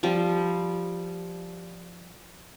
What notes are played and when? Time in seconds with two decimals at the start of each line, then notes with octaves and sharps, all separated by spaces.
0.03 F3 G3